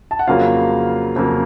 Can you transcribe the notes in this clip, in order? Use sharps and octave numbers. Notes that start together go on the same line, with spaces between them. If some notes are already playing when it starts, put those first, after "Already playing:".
A5
F#5
F2 C#3 F#3 A#3 F4 F5
F2 C#3 F#3 A#3